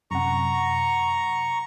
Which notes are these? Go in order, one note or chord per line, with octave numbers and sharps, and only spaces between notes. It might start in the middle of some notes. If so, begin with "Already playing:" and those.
F#2 C3 F#5 A#5 C#6